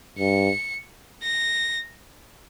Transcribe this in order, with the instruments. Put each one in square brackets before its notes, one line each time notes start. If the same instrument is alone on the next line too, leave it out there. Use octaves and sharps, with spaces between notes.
[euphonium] G2 [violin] C#7
[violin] A#6